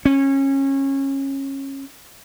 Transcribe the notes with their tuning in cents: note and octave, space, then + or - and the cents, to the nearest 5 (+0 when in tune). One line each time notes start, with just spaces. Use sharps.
C#4 -20